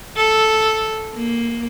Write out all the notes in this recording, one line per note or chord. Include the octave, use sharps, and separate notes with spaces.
A4
A#3